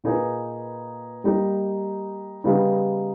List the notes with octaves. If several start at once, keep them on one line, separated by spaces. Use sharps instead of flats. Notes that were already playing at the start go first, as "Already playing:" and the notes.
A#2 A#3 D#4 G#4 B4
G3 A#3 D#4
C#3 G3 B3 D#4